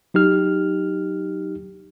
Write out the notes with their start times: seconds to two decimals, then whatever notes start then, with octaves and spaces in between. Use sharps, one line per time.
0.14 F#3 D#4 G4 F6